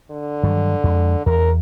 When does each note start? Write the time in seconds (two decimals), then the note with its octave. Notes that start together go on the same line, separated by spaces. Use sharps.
0.11 D3
0.43 G2 D#3 F#3
0.84 F2 G#3
1.26 E2 A#4